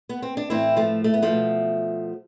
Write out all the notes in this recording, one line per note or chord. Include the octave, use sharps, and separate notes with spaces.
B3
C4
D4
A2 E3 C4 E4
F3 A3
A3
B3
F3 A3
B2